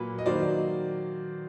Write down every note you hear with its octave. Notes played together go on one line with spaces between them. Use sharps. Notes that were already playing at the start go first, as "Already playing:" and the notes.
Already playing: A#2 F#3 A#3 B4
D#5
D#3 F#3 A#3 C5 D5